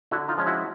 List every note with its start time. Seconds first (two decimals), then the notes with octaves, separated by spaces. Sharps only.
0.11 D3 E4 F#4
0.28 D#4 F4
0.37 F3 G#3 C#4
0.46 E4 F#4